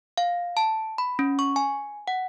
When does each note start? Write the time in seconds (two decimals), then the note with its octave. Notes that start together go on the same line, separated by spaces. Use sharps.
0.18 F5
0.57 A5
0.98 B5
1.19 C#4
1.39 C#6
1.56 G#5
2.08 F#5